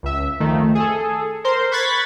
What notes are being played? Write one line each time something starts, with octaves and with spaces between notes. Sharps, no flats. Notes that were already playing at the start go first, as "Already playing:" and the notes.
C#2 E5
F2 D#3 A3
G#4 A4
A#4 C5 C6
B5 C#6 F#6 G#6 A6 B6